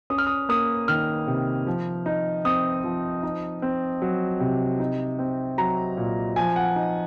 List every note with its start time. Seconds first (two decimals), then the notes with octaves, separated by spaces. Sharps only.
0.10 C#4 D#6
0.18 F6
0.27 D#6
0.49 A#3 D#6
0.88 D#3 F6
1.27 C3
1.66 F3
2.06 D#4
2.45 C4 D#6
2.84 F3
3.23 D#4
3.62 C4
4.02 F#3
4.40 C3
4.79 D#4
5.19 C4
5.58 F#3 A#5
5.97 A#2
6.36 F3 G#5
6.56 F#5
6.76 D#4